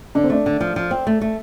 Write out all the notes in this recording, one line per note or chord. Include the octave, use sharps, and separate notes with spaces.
D3 D4
C4
A3 D4
D3
F3
F3
C4
A3
A3